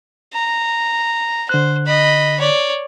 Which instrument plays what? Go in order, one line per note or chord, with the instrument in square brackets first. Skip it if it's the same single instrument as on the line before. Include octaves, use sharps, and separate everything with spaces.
[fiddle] A#5
[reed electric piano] D3 F#6 [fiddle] C5
[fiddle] D#5 B5
C#5 D5